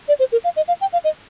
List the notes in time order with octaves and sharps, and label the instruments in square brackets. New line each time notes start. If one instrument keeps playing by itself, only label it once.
[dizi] D5
C5
A#4
F5
D#5
F5
G5
F5
D#5